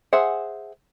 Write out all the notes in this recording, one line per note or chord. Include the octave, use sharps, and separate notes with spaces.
G#4 C5 E5 F#5